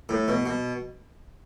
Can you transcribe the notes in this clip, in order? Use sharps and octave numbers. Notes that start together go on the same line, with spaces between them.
A2
B2
B2